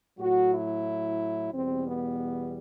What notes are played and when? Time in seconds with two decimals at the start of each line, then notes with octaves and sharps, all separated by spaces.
0.18 A2 F#3 F#4
0.52 E4
1.53 E2 B2 G3 C4
1.87 B3